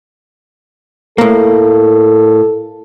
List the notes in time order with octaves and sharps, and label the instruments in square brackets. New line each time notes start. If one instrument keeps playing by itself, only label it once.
[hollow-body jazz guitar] A2 A#3 [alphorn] A4